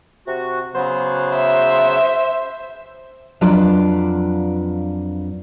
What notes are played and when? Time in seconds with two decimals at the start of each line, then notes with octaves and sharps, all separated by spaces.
0.27 C3 F#4
0.75 C#3 F#3 B3 C5
1.34 E5
3.41 F2 F#3 D4 F4 B4 D5